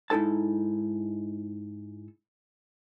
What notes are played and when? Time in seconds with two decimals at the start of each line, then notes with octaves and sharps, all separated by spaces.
0.10 G#2 D#4 E4 A4 A5